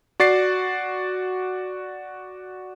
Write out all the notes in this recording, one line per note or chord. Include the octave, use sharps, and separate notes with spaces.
F#4 D5 A6 C7